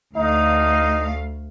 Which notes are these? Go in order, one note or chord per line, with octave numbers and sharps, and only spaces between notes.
D2 A3 D#4 F5